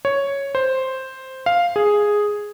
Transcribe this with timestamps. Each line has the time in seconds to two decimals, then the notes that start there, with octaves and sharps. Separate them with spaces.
0.05 C#5
0.55 C5
1.46 F5
1.76 G#4